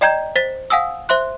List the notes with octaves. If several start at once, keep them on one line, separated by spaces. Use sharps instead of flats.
D5 D#5 G5 A#5 G6 G#6
C5 A6 B6
F5 F#5 G#5 D#6 E6
C5 E5 C6 F#6